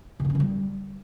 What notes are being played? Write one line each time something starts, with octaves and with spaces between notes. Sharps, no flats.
C3
C#3
C#4
D3
G3